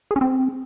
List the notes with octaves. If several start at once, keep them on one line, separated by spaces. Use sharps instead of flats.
G#4
C#4
C4